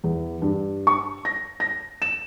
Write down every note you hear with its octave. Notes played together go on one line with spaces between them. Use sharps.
E2
G2
C#6
A#6
A#6
E7